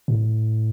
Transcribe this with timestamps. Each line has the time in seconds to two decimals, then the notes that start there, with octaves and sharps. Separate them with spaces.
0.08 A2